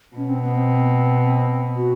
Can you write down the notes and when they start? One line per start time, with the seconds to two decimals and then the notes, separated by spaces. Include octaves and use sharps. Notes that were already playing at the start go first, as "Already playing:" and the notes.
0.16 B2 C#4
0.29 C4
0.42 B3
0.56 C4
1.76 F#4